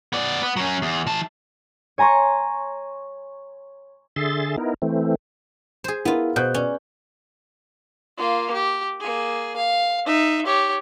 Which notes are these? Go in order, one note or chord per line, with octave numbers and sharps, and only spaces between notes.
B3 D5
B3
F#3 C#4
E2
E3 A5
C#5 G#5 A#5 C6 C#6
D3 G#4 E5 C6 A6
B3 D#4 E4 A#4
E3 A3 C4
G#4 C5
B3 E4 F4 A#4
B2 C5 F#6 G6
C#4 B4 D5
A#3 F4
G4
A#3 G#4
F5
D#4 E5
G4 C#5